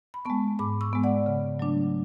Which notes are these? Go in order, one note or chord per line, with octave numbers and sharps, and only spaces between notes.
B5
G#3 B3 A5 C#6
G#2 B5 D6
C#6 E6
G#3 B3
D5 F#5
C#3
F#3 A3 D4